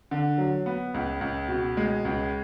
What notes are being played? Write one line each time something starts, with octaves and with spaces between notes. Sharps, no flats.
D3
F#3
B3
C#2
C#2
B2
G#3
C#2